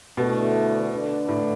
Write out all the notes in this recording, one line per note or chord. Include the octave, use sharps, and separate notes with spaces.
D2 B2 D3 A3 E4
D3 A3 D4 B4 D5
A2